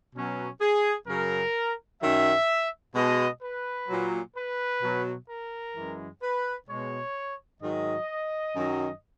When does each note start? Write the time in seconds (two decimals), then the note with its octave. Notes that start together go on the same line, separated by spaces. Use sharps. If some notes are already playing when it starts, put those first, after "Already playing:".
0.15 B2 F#3 C#4
0.61 G#4
1.08 F#2 C#3 F#3 A#4
2.01 F#2 D#3 F#3 E5
2.95 B2 G#3 D#5
3.41 B4
3.89 A#2 F#3
4.35 B4
4.82 B2 F#3
5.29 A#4
5.75 F#2 E3 G#3
6.23 B4
6.68 B2 G#3 C#5
7.62 G#2 D#3 F#3 D#5
8.56 F#2 D#3 F#3